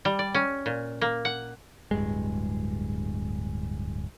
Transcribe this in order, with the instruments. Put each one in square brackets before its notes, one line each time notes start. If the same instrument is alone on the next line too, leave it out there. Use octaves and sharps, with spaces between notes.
[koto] G3
D5
C#4
A#2
A#3
F#5
[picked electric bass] D1 G2 G#3